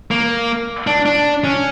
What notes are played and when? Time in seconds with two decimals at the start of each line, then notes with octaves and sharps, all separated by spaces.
0.11 A#3
0.87 D4
1.06 D4
1.44 C#4